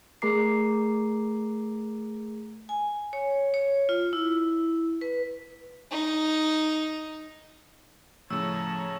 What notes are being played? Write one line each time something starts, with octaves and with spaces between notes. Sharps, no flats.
A3 G#4 A#4 A#5 D6 C7
G#5
C#5
C#5
F4
E4
B4
D#4
A2 C#3 F3 A3 C#5 A5 A#5 E6